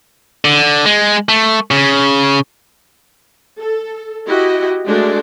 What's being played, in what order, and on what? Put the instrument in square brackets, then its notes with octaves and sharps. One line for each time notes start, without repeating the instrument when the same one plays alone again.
[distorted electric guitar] D3
G#3
A3
C#3
[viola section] A4
E4 F#4 G4 D#5
G#3 A3 D4 F#4